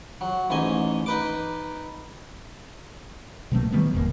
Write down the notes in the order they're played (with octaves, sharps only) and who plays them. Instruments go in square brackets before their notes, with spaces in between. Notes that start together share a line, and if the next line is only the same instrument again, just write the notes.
[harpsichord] F#3
A1 G#2 D#5 G#5
D#4 B4 D6
[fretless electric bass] B2 F#3 A3 A#3
D#3 G3 B3
F1 E2 A2 A#3